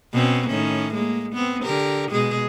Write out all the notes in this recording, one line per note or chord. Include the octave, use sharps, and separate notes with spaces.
B2 C4 C#4
A2 D#3 C#4
G#3 A#3
B3 C4
D3 G4 A#4
B2 G#3 G#4